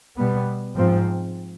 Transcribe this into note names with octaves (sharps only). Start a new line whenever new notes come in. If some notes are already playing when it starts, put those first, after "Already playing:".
B2 G3 B3
G#2 F3 C4